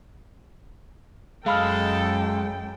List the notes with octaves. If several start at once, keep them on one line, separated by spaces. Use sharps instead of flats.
F#2 G#3 A4 F5 G5 B5 F6